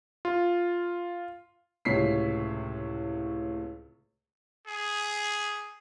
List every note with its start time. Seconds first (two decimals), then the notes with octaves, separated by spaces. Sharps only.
0.25 F4
1.85 C#2 A2 C3 C#5 B6 C7
4.67 G#4